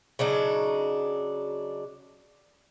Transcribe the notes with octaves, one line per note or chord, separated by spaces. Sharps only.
C#3 F#3 D4 D#4